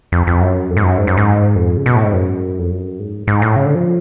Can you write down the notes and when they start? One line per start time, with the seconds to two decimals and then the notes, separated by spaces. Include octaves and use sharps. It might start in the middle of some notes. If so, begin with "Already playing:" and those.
0.12 F2
0.27 F2
0.41 F#2
0.70 F2
0.77 G#2
0.83 F#2
0.98 G#2
1.07 F#2
1.17 G#2
1.56 F2
1.77 C#3
1.86 B2
1.95 A2
2.04 G#2
2.13 F#2
2.59 F2
2.70 F#2
2.99 G#2
3.27 G#2
3.42 A2
3.56 C#3
3.66 D3
3.75 F3